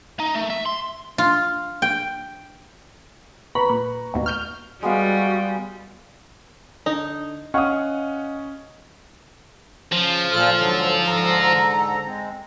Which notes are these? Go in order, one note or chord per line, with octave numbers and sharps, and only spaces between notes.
D#4
A3
E5
C6
F4
G5
B4 A#5 B5 C#6
A#2
A1 D#2 B2
C#6 F6 G6 F7
G3 G#3 B3 F#4 F5
D3 D#4
C#4 D#5 F5 F#5 C#6 D#6 F6
C#3 F3
A#2 F4 A4 F6
G#2 D3 F#3
G#2 D3 A4 A#5
G#3 C4